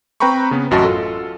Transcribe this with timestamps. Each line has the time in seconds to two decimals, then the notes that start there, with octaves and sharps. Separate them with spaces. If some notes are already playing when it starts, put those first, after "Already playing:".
0.20 C4 B4 G5 A#5 B5 C#6
0.51 C#3 B3
0.71 A1 F#2 F#4 D#5 A5
0.83 F4 A4